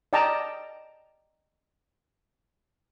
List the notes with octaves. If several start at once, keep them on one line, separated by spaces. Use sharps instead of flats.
D5 D#5 G5 A5 A#5